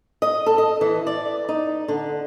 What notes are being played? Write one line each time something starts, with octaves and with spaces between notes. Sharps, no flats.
D#5
A4
D#5
E3
D5
D#4
D3